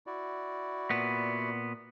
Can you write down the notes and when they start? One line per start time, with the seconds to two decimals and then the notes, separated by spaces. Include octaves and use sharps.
0.07 E4 F#4 D5
0.90 A#2 B3